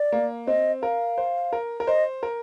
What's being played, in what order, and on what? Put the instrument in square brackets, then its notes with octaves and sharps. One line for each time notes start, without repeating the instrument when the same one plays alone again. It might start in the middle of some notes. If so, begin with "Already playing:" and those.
Already playing: [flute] D5
[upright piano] A#3
[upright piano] C4 [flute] D#5
[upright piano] A#4 [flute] F5
[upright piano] C5
A#4
A#4
[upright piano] C5 [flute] D#5
[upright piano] A#4